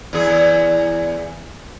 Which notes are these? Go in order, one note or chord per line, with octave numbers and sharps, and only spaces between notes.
E2 G#4